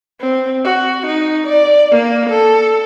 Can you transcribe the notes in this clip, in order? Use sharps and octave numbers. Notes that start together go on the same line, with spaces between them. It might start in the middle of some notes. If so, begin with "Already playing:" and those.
C4
F#4
D#4
D5
A#3
A4